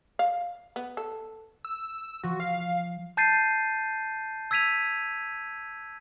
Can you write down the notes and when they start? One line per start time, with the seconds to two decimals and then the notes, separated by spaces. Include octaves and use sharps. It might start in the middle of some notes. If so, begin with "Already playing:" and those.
0.19 F5
0.76 B3
0.97 A4
1.65 E6
2.23 F3 F#4
2.40 F5
3.17 A5 G6 A6 C7 D#7
4.51 E6 G#6 B6 D#7 F7